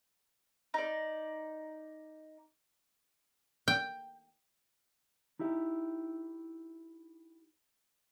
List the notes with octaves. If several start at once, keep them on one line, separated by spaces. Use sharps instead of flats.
D#4 D5
G5
D#4 E4 G4 E5